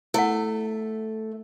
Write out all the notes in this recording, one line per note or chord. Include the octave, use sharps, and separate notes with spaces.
A3 E4 F#5